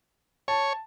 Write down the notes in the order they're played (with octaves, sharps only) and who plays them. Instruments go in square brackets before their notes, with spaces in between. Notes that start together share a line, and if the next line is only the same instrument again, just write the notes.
[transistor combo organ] C#5 [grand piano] A5